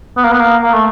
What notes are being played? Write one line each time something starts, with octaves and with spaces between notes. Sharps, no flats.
B3
A#3
B3
A#3
A#3
A3